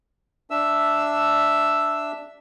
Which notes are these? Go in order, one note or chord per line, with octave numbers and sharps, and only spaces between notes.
D4 E5 E6